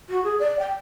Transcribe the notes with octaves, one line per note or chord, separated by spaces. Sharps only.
F#4
G#4
D5
G5